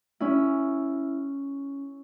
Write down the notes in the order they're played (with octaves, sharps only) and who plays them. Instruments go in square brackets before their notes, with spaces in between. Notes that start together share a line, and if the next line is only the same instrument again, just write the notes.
[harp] C#4 E4